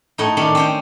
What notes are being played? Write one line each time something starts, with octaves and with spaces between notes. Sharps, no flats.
A2 D#4
D#3 C#4 D4
C4 C#4 G5